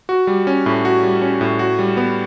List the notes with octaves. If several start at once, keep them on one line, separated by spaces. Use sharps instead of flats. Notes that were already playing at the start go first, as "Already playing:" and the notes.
F#4
G3
C#4
A2
F#4
G3
C#4
A2
F#4
G3
B3